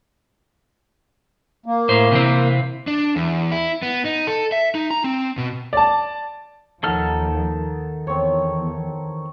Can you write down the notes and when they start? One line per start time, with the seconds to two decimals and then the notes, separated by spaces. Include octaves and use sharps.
1.66 A#3
1.89 A2 C5
2.12 C3 E3 C4
2.87 D4
3.16 E2
3.52 E4
3.82 B3
4.05 D#4
4.27 A4
4.52 E5
4.75 D#4
4.91 A#5
5.04 C4
5.37 B2
5.73 D5 A5
6.83 D#2 D#3 F3 D#4 A4 F#5 F6
8.07 E2 C4 C#5